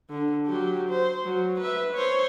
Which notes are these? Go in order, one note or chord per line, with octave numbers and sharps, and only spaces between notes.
D3
F#3 G4
C5
F#3
B4 E5
C5 C#5